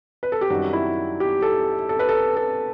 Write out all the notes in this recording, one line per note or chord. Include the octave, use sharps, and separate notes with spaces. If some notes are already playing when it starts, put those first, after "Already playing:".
B4
A4
G4
F#2 D#3 G3 F#4
E4
G4
A4
A4
B4
A4
A4